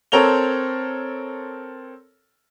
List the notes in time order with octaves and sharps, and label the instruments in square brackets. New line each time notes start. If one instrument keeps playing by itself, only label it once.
[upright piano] C4 A4 A#4 C#5 F7 G7